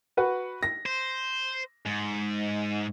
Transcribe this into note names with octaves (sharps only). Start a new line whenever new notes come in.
F#4 B4 F#5
A#6
C5
G#2